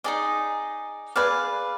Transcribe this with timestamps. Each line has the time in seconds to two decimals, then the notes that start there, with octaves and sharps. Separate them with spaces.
0.04 D#4 G#4 D5 D#5
1.16 G#4 B4 D5 F5